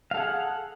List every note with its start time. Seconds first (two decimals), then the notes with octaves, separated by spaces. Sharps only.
0.11 F5
0.14 A4
0.17 G#4
0.20 F#5